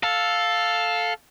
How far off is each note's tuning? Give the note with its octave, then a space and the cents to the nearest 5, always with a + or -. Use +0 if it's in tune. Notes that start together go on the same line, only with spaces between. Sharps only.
A4 +0 F5 +10